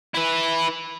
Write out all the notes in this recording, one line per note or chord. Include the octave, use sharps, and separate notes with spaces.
E4 B4